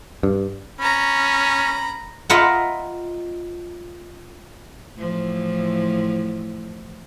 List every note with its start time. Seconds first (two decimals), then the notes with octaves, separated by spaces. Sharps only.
0.23 G2
0.79 C#4 A#5 B5
2.30 F4 A#4 B4 D#5 E5 F#5
4.96 A2 E3 F3